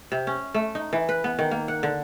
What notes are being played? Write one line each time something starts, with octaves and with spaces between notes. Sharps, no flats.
C3
C#4
A3
D#4
E3
B4
B3
D#3
A#3
F#5
D3